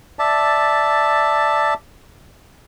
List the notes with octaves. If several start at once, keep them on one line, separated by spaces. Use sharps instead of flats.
D5 E5 A5